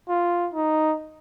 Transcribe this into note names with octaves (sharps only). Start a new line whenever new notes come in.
F4
D#4